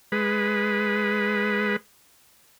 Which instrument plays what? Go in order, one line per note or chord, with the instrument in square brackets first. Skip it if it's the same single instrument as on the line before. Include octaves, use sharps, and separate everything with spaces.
[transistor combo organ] G#3 B4